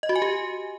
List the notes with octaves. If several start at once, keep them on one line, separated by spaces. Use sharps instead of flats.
D#5
F#4
G#5
G4